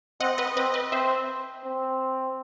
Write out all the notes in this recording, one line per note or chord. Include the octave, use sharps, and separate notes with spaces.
C4 D#5 F#5
B4 D#5
C4 B4 D#5
B4 D#5
C4 C5 E5
C4